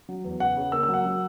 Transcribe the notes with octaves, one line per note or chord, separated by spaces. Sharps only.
F#3
E2
C#3 F#5
C#3
A#3 E6
E6
F#3
F#5
F#3